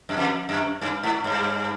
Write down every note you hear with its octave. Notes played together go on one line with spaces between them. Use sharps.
F#2
F2
F#2
G2
G#2
G2